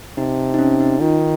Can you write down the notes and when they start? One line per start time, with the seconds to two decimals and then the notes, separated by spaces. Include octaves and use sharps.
0.17 C3 D#4
0.54 D#4
0.59 C#4
0.80 D#4
1.00 D#3 F4